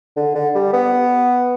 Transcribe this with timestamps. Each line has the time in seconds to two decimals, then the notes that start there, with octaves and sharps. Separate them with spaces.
0.16 D3
0.35 D3
0.55 G3
0.73 B3